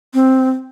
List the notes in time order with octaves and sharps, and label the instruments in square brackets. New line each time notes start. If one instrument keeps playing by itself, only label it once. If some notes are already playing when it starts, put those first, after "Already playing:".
[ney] C4